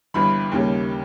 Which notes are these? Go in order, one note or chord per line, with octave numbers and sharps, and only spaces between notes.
G1 G2 E3 B5
D#2 C#3 G3